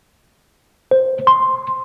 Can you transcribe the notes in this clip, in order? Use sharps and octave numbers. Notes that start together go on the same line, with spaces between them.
C5
C6